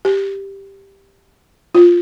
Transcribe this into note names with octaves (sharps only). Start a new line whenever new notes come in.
G4
F4